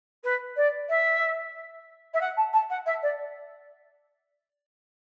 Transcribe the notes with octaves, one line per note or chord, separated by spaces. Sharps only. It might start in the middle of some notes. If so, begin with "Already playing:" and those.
B4
D5
E5
E5
F#5
A5
A5
F#5
E5
D5